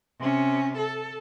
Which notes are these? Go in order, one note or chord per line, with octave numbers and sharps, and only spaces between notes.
C3 C#4
A4